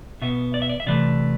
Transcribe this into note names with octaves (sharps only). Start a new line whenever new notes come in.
B2 B3 E5
D5
E5
D5
E5
C3 E3 A3 D5